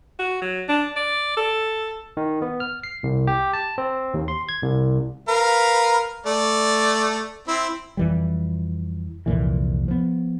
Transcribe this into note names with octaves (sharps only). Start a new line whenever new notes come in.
F#4
F#3
D4
D5
A4
D#3
B3
F6
C7
C2
G4
A5
C4
D#2
C6
G#6
C2
A#4 B4 F5
A3 D5
C4 E4
F2 E3 G3
C2 F2 A#2 E3
F3 B3